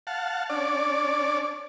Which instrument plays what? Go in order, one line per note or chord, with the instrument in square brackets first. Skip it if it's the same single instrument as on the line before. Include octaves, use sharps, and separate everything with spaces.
[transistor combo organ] F5 F#5 A5
C#4 D4 D5